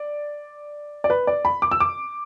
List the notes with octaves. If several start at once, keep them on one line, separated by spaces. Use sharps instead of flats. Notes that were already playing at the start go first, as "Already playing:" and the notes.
Already playing: D5
D5
B4
D5
B5
D6
E6
D6